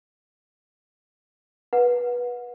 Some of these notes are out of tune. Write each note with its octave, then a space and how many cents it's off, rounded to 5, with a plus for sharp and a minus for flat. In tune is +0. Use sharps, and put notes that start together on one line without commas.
B4 -20 F#5 -30